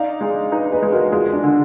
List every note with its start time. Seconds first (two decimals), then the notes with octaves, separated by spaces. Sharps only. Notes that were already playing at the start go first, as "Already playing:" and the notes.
Already playing: D#4 D5 F5
0.21 G#3
0.52 D#4 B4 D#5
0.72 G#4 B4
0.83 G#3
0.92 F#4 A#4
1.12 G#3 F4 G#4
1.33 D4
1.43 D3